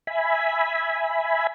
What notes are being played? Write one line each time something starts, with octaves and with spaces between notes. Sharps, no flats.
E5 G#5 B5